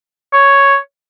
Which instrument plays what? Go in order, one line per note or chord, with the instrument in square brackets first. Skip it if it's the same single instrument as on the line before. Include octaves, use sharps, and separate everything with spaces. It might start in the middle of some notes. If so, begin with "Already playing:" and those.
[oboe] C#5